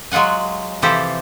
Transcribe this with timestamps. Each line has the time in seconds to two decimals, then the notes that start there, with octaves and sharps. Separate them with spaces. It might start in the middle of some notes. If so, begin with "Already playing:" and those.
0.12 F#3 G#3 F4 F#5 G#5
0.82 C3 E3 F3 G4 A4 C5